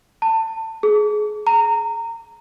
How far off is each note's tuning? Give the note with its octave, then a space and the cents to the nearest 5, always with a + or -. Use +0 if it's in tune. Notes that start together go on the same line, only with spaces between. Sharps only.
A5 +25
G#4 +25
A#5 -20